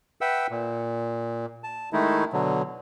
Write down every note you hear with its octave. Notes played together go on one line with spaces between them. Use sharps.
B4 E5 F#5 G5 E6
A#2
A5
D#3 G#3 A3 D#4 E4
B2 D3 F#3